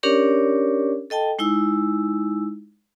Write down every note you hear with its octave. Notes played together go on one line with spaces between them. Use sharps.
C#4 D4 G4 A#4 C#5 D5
A4 D#5 G5 A5
G#3 D#4 E4 E6